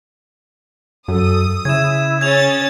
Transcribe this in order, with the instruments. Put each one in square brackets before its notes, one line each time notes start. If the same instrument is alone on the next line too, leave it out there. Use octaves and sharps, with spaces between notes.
[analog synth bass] F#2 [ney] A4 [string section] D#6
[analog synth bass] C#3 [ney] E4 [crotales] G#6 E7
[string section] C#4 A6 [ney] G#4 [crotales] G#6 F7